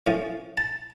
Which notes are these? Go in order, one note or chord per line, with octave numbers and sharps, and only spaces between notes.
A2 F3 C#4
A5